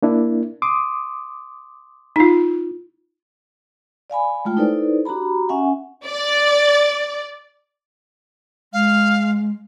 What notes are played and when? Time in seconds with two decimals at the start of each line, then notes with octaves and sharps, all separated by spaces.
0.03 A#3 D4 E4
0.62 C6 D6 D#6
2.16 D#4 F4
4.10 D5 F5 G#5 B5
4.45 G#3 A3 F4 G5
4.57 D#4 E4 A4 B4 C5 D5
5.05 D4 F#4 G4 A#5 B5
5.49 C#4 E5 F#5 G#5
6.06 D5
8.73 G#3 F5